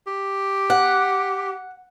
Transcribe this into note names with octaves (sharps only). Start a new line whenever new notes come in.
G4
F#5